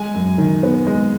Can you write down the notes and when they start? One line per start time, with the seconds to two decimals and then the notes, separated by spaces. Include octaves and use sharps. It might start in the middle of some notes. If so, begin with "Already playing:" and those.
Already playing: G#3 G#5
0.15 F#2
0.38 D#3
0.63 B3
0.87 G#3